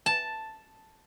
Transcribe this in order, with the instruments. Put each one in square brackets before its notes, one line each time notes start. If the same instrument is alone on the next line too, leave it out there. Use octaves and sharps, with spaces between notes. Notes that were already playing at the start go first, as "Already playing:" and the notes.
[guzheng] A5